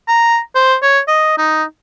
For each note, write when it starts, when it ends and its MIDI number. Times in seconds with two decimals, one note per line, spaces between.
0.08 0.38 82
0.55 0.75 72
0.83 0.99 73
1.08 1.35 75
1.38 1.64 63